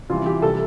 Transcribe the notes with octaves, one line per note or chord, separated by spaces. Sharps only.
C3 E3 G3 F4
G4
C3 G3 A4